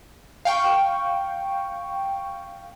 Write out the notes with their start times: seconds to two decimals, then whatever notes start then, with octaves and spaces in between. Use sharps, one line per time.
0.45 F5 G5 C#6